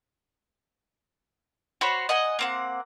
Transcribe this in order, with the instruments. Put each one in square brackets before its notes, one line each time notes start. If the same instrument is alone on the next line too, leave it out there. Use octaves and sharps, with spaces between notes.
[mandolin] F#4 C5 C#5 B5
D#5 F#5 G#5
A#3 C4 F#5